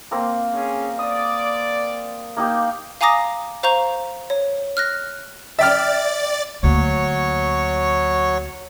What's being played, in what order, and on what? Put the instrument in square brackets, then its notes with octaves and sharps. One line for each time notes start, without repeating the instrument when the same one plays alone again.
[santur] A#3 C4 A#4
[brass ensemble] C#4 G#4
[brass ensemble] D5 [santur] D#6
[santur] A#3 D#4 G4
[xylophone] F5 G#5 A#5 D6 D#6 A#6
C5 F5 A#5 C#6 G6 F7
C#5
F6 F#6 A#6
[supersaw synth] D5 A6 [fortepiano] E5 G5 F6
[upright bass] D2 A#3 [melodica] F#3 C#5 C#6